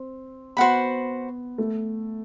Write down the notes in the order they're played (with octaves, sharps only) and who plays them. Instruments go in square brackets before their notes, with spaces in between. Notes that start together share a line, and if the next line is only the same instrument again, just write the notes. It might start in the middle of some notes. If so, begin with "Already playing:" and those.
Already playing: [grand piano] C4
[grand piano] B3 [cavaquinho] F#4 C5 F#5 B5
[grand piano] A3